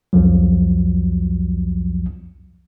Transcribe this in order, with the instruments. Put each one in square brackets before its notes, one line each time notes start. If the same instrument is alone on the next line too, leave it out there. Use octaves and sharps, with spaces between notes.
[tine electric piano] C2 F2 F3 F#3